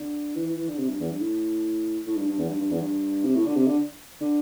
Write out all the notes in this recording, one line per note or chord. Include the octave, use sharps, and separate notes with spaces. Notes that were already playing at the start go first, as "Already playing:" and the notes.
Already playing: D3
E3
E3
E3
D3
C3
G2
E2
G2
A2
A2
G2
G2
E2
G2
G2
E2
G2
C3
A2
D3
C3
D3
D3